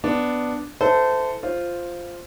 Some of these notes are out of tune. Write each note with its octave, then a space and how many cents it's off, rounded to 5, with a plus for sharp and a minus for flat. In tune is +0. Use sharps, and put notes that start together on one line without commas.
B3 +5 D4 +0
E4 +0 A4 +0 C5 -30
F4 -5 C5 +0